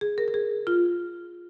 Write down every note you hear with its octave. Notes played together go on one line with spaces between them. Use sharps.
G#4
A#4
A#4
G#4
F4